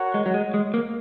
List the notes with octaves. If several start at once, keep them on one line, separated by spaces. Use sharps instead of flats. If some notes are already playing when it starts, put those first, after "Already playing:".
Already playing: F#4 A#4 C#5 F#5
G#3
F#3
G#3
G#3
A#3